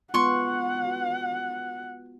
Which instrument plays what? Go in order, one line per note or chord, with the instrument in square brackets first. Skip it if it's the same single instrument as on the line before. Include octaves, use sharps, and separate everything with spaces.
[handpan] G#3 B3 F4 [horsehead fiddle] F#5 [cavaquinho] C6 C#6
[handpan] F#4